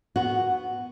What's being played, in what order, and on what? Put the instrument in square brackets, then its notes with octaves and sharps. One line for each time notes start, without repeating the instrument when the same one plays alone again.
[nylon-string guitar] B3 F#4